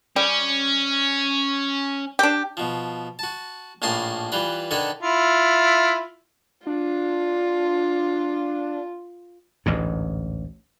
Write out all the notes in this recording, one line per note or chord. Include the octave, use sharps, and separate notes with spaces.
G3 C#4
D4 G4
B2 F3
F#4 A5
A#1 A2 A#3 A5 C6 D#6
E3 G3 F4 B4
D3 D#3 A4 B4 G#5
E4 F4
D4 F4
A1 D2 G#2